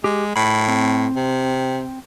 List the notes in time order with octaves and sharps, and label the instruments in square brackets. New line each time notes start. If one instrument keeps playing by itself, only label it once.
[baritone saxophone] G#3 [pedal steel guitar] G4
[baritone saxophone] A2 [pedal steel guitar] B5
[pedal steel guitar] C4
[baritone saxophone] C3